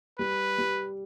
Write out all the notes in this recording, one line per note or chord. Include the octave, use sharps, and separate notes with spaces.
G3 B4
G3